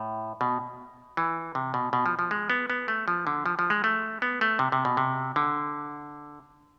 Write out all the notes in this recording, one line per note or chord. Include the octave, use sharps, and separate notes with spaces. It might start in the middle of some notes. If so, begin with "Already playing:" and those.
Already playing: A2
B2
E3
C3
B2
B2
F3
F3
G#3
B3
B3
A3
F3
D3
F3
F3
G#3
A3
B3
A3
C3
C3
B2
C3
D3